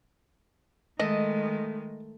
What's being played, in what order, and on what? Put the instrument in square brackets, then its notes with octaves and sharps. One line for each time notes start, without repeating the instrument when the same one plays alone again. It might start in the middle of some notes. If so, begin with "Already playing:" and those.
[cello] D#3 G#3 [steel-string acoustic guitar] A3 [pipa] D#5